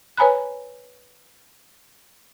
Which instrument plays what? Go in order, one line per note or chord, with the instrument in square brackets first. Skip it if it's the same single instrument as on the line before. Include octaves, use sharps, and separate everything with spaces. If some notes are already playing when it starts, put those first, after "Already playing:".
[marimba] B4 C#5 G#5 A#5 B5 F#6